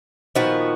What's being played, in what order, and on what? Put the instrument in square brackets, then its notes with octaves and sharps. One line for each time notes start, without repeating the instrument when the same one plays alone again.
[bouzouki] A#2 F3 B3 F#4 [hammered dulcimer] D#3